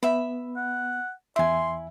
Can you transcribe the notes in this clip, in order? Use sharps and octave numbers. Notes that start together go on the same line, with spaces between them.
B3 E5 B5
F#5
E2 E4 E5 G#5 C6